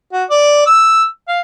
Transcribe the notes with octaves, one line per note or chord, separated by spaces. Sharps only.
F#4
D5
E6
F5